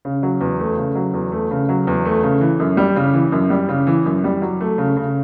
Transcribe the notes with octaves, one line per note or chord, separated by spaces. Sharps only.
C#3
F#3
E2
A3
C#3
F#3
E2
A3
C#3
F#3
E2
A3
C#3
E3
F#2
G3
C#3
E3
F#2
G3
C#3
E3
F#2
G3
F#3
A3
C#3
C#3